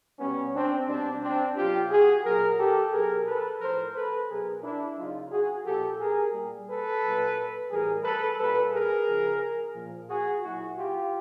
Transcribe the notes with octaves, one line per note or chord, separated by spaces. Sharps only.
B2 G3 B3 C#4
C4 D4
B2 G3 C4 D4
C4 D4
B2 F#3 F4 G4
F#4 G#4
A#2 F#3 G#4 A#4
G4 A4
B2 F#3 G#4 A#4
A4 B4
A2 F3 A#4 C5
A4 B4
B2 F#3 G#4 A#4
D4 E4
C#3 F#3 D#4 F4
F#4 G#4
A#2 F3 G4 A4
G#4 A#4
A#2 G3
A4 B4
A#2 F#3
A2 E3 G3 G#4 A#4
A4 B4
A#2 G3 A4 B4
G#4 A#4
C#3 F3
A#2 F3
F#4 G#4
A#2 F#3 E4 F#4
F4 G4